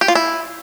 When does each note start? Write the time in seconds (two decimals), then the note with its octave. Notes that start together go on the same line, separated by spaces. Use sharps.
0.01 G4
0.08 F4
0.15 E4